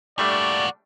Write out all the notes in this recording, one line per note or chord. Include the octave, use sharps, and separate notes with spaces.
G3 A3 A#3 D4 F#4 D5